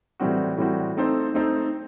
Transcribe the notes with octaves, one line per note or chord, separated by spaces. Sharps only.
A2 E3 G3 C4 F#4
A2 E3 G3 C4 F#4
A3 C4 D#4 A4 C5
A3 C4 D#4 A4 C5